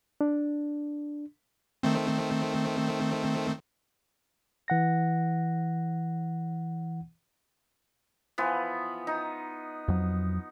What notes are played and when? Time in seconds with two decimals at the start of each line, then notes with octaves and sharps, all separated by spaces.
0.21 D4
1.83 D#3 A3 C4
4.68 E3 F#5 A#6
8.38 E3 F3 B3
9.07 D#4
9.88 F2 F#3